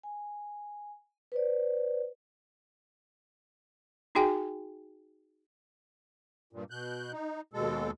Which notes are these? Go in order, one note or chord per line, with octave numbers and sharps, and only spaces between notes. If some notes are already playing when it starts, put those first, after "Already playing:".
G#5
B4 C5 D5
D#4 F#4 G#4 G5 G#5
G2 A#2
B2 F#6 G6
D#4
D#2 B2 G#3 A4